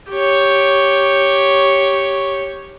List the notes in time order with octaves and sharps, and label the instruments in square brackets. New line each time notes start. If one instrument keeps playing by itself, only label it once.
[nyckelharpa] G4 C#5